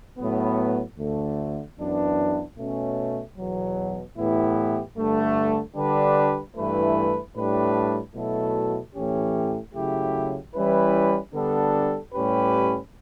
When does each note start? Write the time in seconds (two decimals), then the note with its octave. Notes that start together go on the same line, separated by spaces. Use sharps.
0.18 A2 F#3 B3
0.98 D2 D3 A3
1.78 F#2 E3 B3 D4
2.57 B2 A3 C#4
3.38 E2 B2 F#3
4.17 A2 E3 B3 E4 G4
4.97 G2 D3 A3
5.76 D3 G3 D4 G4 B4
6.56 G2 E3 A3 E4 B4
7.36 A2 G3 D4 G4 B4
8.15 B2 F#3 A3 E4 A4
8.94 A2 E3 A3 C#4 G4
9.74 C#3 F#3 A3 E4 G4
10.54 E3 G3 C#4 E4 B4
11.33 D3 G3 B3 D4 A4
12.13 A2 G3 C#4 G4 B4